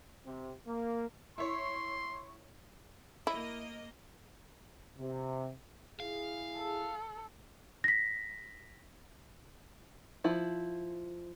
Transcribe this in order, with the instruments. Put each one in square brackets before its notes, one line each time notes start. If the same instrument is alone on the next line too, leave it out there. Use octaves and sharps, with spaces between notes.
[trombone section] C3
A#3
[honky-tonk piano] E4 C#5 [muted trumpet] C6
[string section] A#3 D#5 [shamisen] E4
[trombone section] C3
[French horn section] E4 G#4 [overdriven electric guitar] F5
[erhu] A4
[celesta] A#6 B6
[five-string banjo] F3 E4